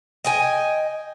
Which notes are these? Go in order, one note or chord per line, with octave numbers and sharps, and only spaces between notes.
D#5 G5 G#5